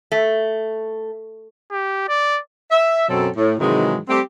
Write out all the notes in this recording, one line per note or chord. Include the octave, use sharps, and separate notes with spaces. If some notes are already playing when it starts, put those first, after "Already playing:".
A3
G4
D5
E5
F#2 B2 F#3 C4 A4
A2
G#2 C3 D#3 E3 F#3 G#3
G3 A3 C4 G4